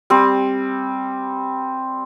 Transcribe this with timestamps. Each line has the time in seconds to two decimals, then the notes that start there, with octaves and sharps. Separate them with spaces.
0.10 G3 C4